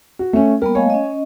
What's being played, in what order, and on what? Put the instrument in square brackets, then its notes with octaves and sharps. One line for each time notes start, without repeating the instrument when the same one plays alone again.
[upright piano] F#4
A3 C#4
[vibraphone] G3 A#3 B3 [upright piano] A#4
[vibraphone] A3 D#5 F5 [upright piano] C#5 G#5
[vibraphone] C#4 D#5